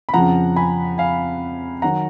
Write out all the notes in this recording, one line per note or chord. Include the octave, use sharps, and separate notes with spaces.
B5
F2 C#3 F3 F#5 A#5
G#5 B5
F5 G#5
D#3 F#3 F#5 A#5